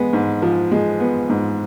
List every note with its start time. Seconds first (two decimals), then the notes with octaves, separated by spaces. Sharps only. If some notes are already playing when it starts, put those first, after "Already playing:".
Already playing: G#3 B3
0.13 G#2
0.42 F3
0.71 G#3
1.00 B3
1.30 G#2